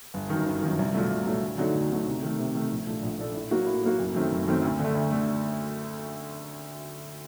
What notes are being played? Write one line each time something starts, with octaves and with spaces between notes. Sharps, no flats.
G1
F#2 D#3
G1
F#2 D#3
C2
A#2 F#3 A3
C2
A#2 F#3 A3
D2
D3 F#3 A3 D#4
D2
D3 F#3 A3 D#4
C3
D#3 A3
C3
D#3 A3
A#1
A#2 A3 D4 A4
A#1
A#2 A3 D4 A4
A2
F#3 A#3 F#4
A2
F#3 A#3 F#4
F#1
F#2 D#3 A3 C4
F#1
F#2 D#3 A3 C4
D2
D3
A3
D2
D3 A3